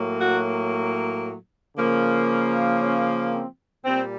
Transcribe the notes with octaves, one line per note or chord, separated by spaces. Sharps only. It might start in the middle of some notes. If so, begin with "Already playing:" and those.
Already playing: A2 F#3 A#3
F#4
C#3 F3 A#3
C#4
C4
A#2 G3 C4